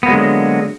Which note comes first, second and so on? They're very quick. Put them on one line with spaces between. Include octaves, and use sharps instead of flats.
B3 A#3 F#3 G#3 D3